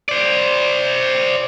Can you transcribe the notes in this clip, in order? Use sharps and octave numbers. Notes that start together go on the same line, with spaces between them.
C5 D5